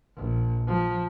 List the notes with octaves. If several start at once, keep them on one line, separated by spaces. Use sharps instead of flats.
A#1
F3